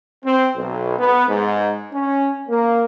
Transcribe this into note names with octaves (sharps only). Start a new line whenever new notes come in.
C4
B1
B3
G#2
C#4
A#3